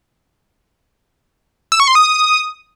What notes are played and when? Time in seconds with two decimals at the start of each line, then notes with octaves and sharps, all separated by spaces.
1.72 E6
1.80 C#6
1.88 C6
1.95 D#6